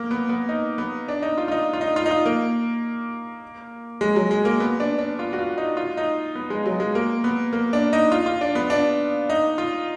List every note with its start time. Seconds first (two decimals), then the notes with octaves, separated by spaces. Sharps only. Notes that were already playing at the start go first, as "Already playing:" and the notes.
Already playing: A#3
0.11 B3
0.29 B3
0.49 D#4
0.78 B3
1.08 D4
1.22 D#4
1.38 F4
1.48 F4
1.51 D#4
1.73 F4
1.81 D#4
1.96 F4
2.06 D#4
2.11 F4
2.26 A#3
4.01 G#3
4.16 F#3
4.31 G#3
4.45 A#3
4.60 B3
4.80 D4
4.98 D4
5.19 F4
5.33 F#4
5.39 F4
5.58 D#4
5.77 F4
5.97 D#4
6.35 B3
6.50 G#3
6.66 F#3
6.80 G#3
6.95 A#3
7.24 B3
7.53 A#3
7.73 D4
7.93 D#4
8.12 F4
8.26 F4
8.41 D4
8.55 B3
8.70 D4
9.30 D#4
9.58 F4